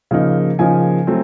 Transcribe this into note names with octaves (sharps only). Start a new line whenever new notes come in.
C#3 F3 A#3 D#4
C#3 F3 A#3 D#4 G#5
F#3 A3 C4